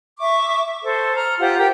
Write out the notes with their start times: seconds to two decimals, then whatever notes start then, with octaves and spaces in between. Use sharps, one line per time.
0.19 E5 C#6 D6
0.84 A4 C5
1.16 A#5 F6
1.39 F4 G4 C5 F#5
1.58 G4 A#4 G5